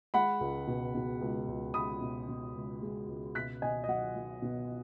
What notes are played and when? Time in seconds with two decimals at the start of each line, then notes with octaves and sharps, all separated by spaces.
0.14 G#3 F#5 B5
0.41 C#2
0.67 B2
0.95 B2
1.21 C#2
1.48 C#2
1.74 C#2 B5 D#6
2.01 B2
2.28 B2
2.55 C#2
2.82 G#3
3.08 C#2
3.35 B2 F#6 B6
3.62 B2 D#5 G#5
3.84 D#5
3.88 F#3 F#5
4.16 F#3
4.42 B2